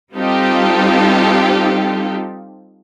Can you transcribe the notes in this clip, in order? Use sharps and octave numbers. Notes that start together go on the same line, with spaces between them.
G3 C4 D#4 F4 G4 A4